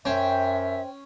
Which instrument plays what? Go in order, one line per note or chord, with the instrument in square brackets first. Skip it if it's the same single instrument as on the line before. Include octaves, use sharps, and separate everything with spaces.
[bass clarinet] F#2 [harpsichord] C#4 [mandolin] C5 G5 [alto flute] E5